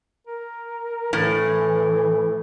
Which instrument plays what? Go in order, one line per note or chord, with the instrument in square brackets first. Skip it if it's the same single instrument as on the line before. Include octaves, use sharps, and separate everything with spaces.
[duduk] A#4
[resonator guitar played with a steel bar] A2 [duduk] E3